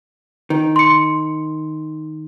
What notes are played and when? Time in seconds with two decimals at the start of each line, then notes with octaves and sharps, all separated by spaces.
0.50 D#3
0.76 C6 C#7